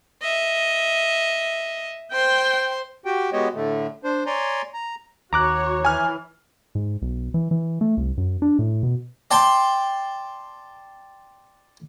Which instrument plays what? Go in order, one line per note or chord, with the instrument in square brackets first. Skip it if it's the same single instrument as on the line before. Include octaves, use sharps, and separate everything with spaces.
[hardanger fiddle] D#5 E5
[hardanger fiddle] C5 C6 [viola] G5
[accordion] F#4 G4 G5
G#3 B3 F#4 G4 C#5 D#5
A2 D3 A3
D4 C5
C#5 D5 G#5 A#5 C6
A#5
[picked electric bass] D#2 [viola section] F#4 C#5 [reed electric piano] A#5 D6 F#6
[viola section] E3 [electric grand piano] G#5 F6
[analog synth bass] G#2
B1
E3
E3
A3
C2
F#2
D4
A2
B2
[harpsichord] D5 G5 A5 C6